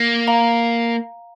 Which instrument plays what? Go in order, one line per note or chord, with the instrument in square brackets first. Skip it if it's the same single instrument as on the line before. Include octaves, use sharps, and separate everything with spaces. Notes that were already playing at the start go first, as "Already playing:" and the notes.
Already playing: [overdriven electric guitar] A#3
[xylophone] F5 A#5